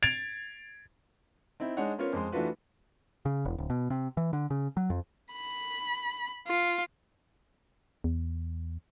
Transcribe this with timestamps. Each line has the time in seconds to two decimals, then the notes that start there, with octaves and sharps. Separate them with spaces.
0.03 G#6 A6 D7 F7
1.60 C4 D#4 E4
1.77 G#3 D4 D#4 C#5 F#5
1.98 B3 C#4 F4 A#4 C5 C#5
2.13 F2 G#3 C6
2.32 E3 A3 D4 F4 F#4 B4
3.25 C#3
3.45 E1
3.58 D1
3.70 B2
3.90 C3
4.17 E3
4.33 D3
4.50 C#3
4.77 F#3
4.90 F2
5.33 B5
6.47 F4
8.04 E2